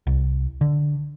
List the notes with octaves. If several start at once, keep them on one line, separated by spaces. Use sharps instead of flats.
C2
D3